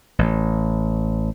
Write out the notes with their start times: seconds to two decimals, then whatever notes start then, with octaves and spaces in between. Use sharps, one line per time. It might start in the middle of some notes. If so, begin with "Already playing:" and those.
0.19 A1